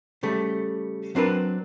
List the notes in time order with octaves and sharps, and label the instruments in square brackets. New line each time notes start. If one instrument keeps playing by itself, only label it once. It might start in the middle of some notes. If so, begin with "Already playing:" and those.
[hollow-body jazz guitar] C#3 G3 A3
F#3 C4 D4 A#4 B4